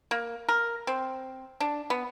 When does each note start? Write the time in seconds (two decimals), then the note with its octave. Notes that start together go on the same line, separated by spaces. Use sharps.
0.11 A#3
0.49 A#4
0.87 C4
1.60 D4
1.90 B3